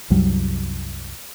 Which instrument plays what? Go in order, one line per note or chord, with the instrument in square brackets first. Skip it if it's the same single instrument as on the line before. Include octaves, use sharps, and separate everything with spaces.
[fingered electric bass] C2 F#2 F#3 G3